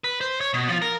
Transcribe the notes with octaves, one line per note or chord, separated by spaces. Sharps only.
B4
C5
C#5
B2
F3 F4
A#4